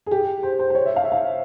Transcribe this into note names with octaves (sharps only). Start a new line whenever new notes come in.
G#4
G4
C5
C5
C5
C#5
E5
F5
E5
F5